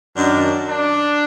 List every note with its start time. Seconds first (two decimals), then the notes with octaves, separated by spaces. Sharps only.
0.17 F#2 D#3 F#3 D4
0.66 D4